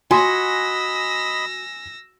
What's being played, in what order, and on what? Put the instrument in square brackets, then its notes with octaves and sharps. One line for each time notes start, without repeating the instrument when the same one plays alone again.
[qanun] F#4 [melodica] D#5 B5 [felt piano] G#5 C6 [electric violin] E6 A#6